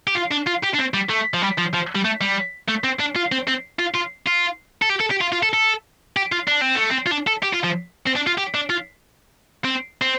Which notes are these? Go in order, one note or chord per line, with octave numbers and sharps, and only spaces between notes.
G4
F4
D4
F4
G4
D4
C4
G3
A3
F3
G3
F3
F3
G3
A3
G3
A3
C4
D4
F4
C4
C4
F4
F4
F4
A4
G4
A4
G4
F4
F4
A4
A4
G4
F4
D4
C4
A3
C4
F4
D4
A4
G4
F4
F3
C4
D4
F4
G4
D4
F4
C4
C4